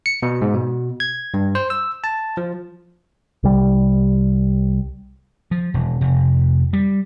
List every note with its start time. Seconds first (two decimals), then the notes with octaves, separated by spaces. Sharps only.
0.06 C#7
0.23 B2
0.42 G#2
0.54 B2
1.00 G#6
1.34 G2
1.55 C5
1.70 E6
2.04 A5
2.37 F3
3.43 C2 G3
5.51 F3
5.74 E1
6.01 F1
6.73 G3